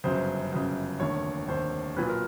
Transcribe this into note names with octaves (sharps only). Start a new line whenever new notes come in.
G1 F#2 C#3 C5
G1 F#2 C#3
F1 D#2 D3 C#5
F1 D#2 D3 C5
B1 A#2 F#3 B4
A#4